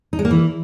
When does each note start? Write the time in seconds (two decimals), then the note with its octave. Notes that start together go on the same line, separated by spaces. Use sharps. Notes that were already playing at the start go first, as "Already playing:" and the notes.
0.13 D#4
0.19 G#3
0.25 A#3
0.31 E3